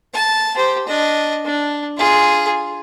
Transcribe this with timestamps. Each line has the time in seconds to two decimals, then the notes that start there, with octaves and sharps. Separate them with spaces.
0.14 A5
0.56 G4 C5
0.87 D4 D#5
1.45 D4
1.97 F4 G#4